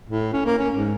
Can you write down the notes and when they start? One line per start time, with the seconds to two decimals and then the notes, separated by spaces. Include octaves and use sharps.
0.09 A2
0.33 C#4
0.46 A#3
0.58 C#4
0.75 G#2